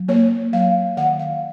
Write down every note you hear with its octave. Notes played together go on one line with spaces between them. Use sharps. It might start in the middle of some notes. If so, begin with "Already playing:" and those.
Already playing: F#3
A#3 C#5
F#3 F5
D#3 F#5
F5